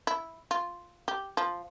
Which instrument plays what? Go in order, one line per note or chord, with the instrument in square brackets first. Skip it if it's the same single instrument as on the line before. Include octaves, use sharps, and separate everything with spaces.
[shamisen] E4
F4
G4
F3